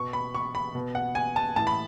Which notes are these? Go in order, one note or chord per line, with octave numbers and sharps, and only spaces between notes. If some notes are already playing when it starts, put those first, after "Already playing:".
Already playing: B2 C#6
B5
C#6
B5
B2
F#5
G#5
A5
A2 E3 A5
B5